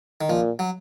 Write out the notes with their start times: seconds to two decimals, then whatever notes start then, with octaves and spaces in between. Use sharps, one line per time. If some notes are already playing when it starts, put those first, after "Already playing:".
0.21 D#3
0.29 A#2 F3
0.59 F#3